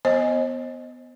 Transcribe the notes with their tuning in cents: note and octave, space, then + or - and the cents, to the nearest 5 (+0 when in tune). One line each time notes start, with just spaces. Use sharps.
B3 +10 C5 +40 D#5 +0